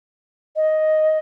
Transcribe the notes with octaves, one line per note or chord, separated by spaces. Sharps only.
D#5